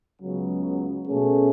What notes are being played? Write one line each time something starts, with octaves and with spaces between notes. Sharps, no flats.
C#2 C#3 F#3 B3
B2 A3 C#4 G#4